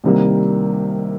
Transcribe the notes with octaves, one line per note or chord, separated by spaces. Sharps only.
C2 C3 D#3 G3 A#3